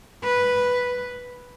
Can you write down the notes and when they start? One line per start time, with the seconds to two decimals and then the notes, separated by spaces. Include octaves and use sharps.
0.24 B4